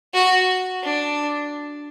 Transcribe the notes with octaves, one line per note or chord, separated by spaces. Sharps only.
F#4
D4